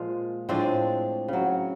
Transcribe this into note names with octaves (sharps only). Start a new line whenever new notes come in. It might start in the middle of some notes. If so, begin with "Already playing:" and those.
Already playing: A#2 F3 G#3 F4
A2 F3 G#3 C4 D4
C#3 F#3